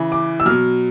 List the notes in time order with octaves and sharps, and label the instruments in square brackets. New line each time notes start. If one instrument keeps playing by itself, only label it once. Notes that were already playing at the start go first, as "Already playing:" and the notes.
Already playing: [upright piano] C#3 E3
D6
E6
B2 F#3 F6